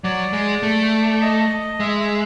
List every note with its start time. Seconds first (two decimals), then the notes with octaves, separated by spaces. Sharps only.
0.04 F#3 D5
0.33 G#3
0.63 A3
1.21 D#5
1.80 G#3 E5
2.00 E5